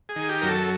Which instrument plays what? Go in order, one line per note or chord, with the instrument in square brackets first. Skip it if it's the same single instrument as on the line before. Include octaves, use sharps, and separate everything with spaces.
[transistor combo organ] G#4
D#3
G4
F#2 A#4
A4